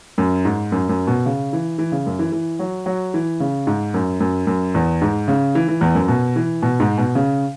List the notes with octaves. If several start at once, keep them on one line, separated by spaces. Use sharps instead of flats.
F#2
G#2
F#2
F#2
B2
C#3
E3
E3
C#3
F#2
E3
E3
F#3
F#3
E3
C#3
G#2
F#2
F#2
F#2
E2
G#2
C#3
E3
E3
E2
F#2
B2
E3
B2
G#2
B2
C#3